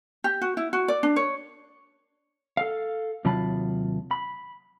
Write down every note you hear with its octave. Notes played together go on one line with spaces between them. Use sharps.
G4
F#4
E4
F#4
D5
D4
C#5
A4 F5
D#2 C3 F#3 F4 A5 B5
B5